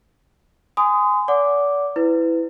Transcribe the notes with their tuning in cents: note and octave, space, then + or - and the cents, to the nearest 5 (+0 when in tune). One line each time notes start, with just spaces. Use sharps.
G#5 +0 C6 -35 D#6 +0
D5 -35 F#5 +0 D6 +0
E4 +0 B4 +25